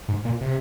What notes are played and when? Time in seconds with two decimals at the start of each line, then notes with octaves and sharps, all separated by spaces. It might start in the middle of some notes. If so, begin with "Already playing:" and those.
0.09 G#2
0.25 A#2
0.41 C3